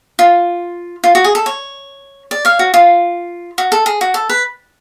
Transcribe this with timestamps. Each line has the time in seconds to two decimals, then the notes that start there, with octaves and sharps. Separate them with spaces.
0.19 F4
1.04 F4
1.15 F#4
1.24 G#4
1.35 A4
1.46 C#5
2.31 D5
2.45 C#5 F5
2.59 F#4
2.74 F4
3.58 F#4
3.72 A4
3.86 G#4
4.01 F#4
4.14 A4
4.29 B4